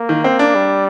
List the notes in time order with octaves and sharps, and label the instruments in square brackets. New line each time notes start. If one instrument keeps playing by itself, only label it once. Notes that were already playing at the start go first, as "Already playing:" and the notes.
Already playing: [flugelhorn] A#3
[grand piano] D#3
C4
D4
[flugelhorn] G3